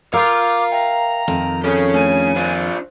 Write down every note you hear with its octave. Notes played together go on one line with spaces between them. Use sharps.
A#4 F5 C6 D6 E6 G6
E5 G5 A#5
F2 D#3
C#4 G#4 A4 C#5
A3 D4 C#5 G#5
D4 F4 C5